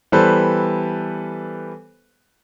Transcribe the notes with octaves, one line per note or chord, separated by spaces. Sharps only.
E3 G3 B3 A4 B4 C5